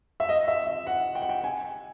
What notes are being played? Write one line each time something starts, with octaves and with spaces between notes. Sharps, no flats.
E5
D#5
E5
E5
F#5
G5
F#5
G5
G#5